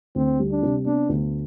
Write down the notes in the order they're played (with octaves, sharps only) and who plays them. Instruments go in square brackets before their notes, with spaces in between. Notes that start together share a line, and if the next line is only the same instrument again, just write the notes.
[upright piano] D2 [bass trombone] C4
[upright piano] G3
[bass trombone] D4
[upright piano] C3
[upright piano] B3 [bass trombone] D4
[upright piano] D2